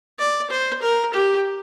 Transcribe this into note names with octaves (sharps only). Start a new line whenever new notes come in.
D5
C5
A#4
G4